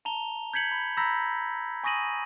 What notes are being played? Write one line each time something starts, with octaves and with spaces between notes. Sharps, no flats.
A5 A#5 F7 G7
G6 G#6 B6 C#7 F#7
B5
A#5 B5 E6 G6 A#6 B6
G#5 C#6 D#6 A#6 D#7 F#7